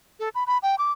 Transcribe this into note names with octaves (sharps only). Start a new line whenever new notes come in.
A4
B5
B5
G5
D6